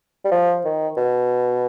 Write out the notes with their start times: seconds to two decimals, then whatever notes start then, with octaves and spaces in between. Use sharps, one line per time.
0.25 G3
0.31 F3
0.65 D#3
0.97 B2